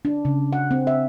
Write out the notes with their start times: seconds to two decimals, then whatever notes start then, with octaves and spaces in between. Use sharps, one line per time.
0.05 D4
0.25 C#3
0.53 F#5
0.71 C4
0.87 E5